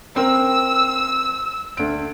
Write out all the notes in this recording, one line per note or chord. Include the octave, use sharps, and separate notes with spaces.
C4 A#4 E6
D2 D7